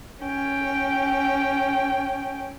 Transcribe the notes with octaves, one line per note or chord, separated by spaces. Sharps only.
C#4 G5